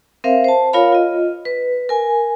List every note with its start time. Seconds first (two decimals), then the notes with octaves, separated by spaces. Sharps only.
0.24 C4 A#4 C5 E5 F5
0.44 C5 A5
0.73 F4 A#4 C#5 F5 B5
0.92 F4 D#5
1.45 B4
1.89 A#4 G#5